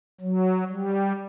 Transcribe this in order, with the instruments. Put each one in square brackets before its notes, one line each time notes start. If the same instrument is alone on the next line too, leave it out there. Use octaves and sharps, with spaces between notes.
[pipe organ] F#3
G3